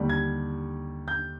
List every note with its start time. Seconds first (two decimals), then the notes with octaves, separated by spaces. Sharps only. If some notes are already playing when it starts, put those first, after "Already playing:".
Already playing: D#2 D3 G3
0.09 G#6
1.08 G6